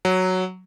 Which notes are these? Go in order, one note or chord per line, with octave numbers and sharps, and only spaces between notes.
F#3